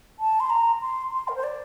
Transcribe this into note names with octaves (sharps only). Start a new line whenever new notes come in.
A5
C6
A#5
C6
C6
A#4
C5
D5